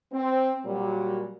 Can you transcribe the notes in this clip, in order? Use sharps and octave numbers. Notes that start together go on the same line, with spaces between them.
C4
A#2 F#3 G3